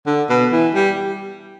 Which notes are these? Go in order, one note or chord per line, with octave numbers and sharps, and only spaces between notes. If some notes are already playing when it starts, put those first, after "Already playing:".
D3
B2
E3
G3